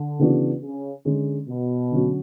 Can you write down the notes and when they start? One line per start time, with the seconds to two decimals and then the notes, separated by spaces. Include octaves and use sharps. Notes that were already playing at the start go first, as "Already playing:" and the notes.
Already playing: D3
0.19 C#3 E3 B3 D4 F#4
0.62 C#3
1.05 D3 G#3 C#4
1.49 B2
1.91 D3 F#3 C#4 F#4